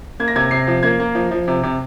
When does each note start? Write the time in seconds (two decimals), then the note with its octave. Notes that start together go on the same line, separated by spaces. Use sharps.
0.20 A#3 G#6
0.28 A#6
0.36 C3 G#6
0.51 C3 C7
0.67 F3
0.83 A#3 G#6
1.00 A#3
1.15 F3
1.31 F3
1.48 C3
1.63 C3